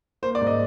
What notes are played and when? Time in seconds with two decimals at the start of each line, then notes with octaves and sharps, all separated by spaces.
0.23 A#3 C5
0.35 D5
0.41 G#2
0.47 D#5